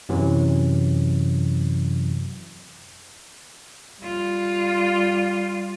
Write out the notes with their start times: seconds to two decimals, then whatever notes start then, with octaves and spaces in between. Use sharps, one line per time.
0.09 F#2 C3 E3 F#3
4.00 G3 F4